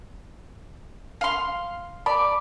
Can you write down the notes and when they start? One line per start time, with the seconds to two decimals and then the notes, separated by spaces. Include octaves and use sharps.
1.21 F5 C6
2.06 D5 A5 B5